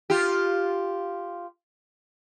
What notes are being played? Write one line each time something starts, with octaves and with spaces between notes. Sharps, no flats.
F4 G4